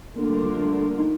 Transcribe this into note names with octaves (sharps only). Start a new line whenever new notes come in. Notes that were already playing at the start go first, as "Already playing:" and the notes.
D3 A3 A#3 D4 F4 A#4
G3
F3
G3
D#4